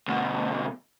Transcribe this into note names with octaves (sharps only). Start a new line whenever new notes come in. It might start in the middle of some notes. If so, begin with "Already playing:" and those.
D2 B2